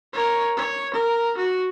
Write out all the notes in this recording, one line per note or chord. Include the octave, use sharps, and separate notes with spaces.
A#4 C#5
C#5
A#4
F#4